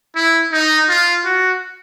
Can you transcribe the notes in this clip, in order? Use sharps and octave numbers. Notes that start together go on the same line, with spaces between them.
E4
D#4
F4
F#4